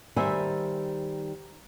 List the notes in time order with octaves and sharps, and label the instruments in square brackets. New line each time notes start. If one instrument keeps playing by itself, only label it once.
[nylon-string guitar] D#3 G3 C5 E5 G#5